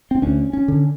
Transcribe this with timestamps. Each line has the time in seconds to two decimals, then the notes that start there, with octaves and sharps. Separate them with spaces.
0.11 C4
0.22 D2 C#4
0.53 C#4
0.68 D3